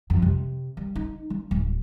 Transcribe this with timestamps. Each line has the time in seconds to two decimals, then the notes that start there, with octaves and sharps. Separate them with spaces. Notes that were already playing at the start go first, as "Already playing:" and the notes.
0.10 F2
0.22 C3
0.77 G3
0.96 D#4
1.30 D4
1.51 D1